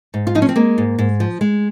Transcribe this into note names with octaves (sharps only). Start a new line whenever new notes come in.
G#2
F4
F3 D#4
C#4
C4
G#3 A#3
G#2
G#2
F3
G#3